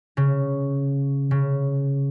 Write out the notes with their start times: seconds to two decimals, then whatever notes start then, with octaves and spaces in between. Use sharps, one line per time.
0.17 C#3
1.31 C#3